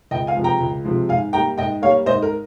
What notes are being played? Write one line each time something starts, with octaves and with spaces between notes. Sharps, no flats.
C#2 D#5 G5
F5 G#5
C3 F3 G#3
G5 A#5
C#2
C3 F3 G#3
G#2 F5 G#5
G3 A#3 G5 A#5
G#2 D#5 G5
G3 A#3 C#5 F5
G#2 C5 D#5
A#4